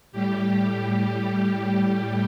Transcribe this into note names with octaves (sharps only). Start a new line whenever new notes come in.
A2 G3 G4
G4